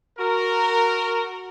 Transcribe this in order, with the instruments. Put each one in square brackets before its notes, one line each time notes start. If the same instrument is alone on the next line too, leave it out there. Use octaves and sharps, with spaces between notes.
[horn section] F#4 A#4